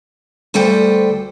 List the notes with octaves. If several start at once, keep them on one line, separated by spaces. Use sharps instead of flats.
D2 G3 A4 B4 C5 G5